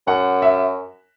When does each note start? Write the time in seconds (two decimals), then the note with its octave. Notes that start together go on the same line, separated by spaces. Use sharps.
0.07 F#2 F#5
0.42 E5